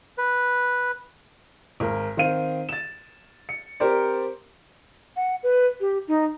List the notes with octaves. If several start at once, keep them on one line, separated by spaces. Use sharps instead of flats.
B4
G#1 A#4
D#3 C4 F5 D#7
A6 E7
C#7
C4 G4 A#4 C5 D5
F#5
B4
G4
D#4